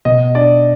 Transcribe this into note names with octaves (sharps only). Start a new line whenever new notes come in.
B2 D#5
D4 D5